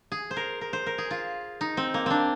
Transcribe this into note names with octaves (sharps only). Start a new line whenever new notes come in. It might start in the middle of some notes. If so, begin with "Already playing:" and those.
G#4
C5
A#4
A#4
C5
A#4
G#4
F4
D#4
C4
A#3
C4 D4